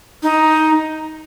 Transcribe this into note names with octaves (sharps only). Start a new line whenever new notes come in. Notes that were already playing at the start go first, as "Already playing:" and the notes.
D#4